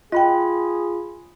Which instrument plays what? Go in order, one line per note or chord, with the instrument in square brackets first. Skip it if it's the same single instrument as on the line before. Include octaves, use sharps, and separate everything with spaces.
[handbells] F4 B5 [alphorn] G#4 [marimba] D#5 G5